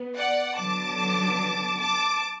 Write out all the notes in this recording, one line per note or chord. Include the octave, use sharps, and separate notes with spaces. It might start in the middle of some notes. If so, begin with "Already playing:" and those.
Already playing: B3
D5 F#5
D3 F#3 B3 A5 D6
A5 D6